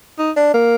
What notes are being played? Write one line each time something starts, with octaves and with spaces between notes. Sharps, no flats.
D#4
D4
A#3